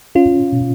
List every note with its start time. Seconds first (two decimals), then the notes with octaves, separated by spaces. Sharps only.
0.15 C#4 F4
0.52 B2